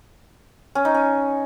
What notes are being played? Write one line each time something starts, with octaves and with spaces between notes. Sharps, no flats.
C#4
D#4
C#4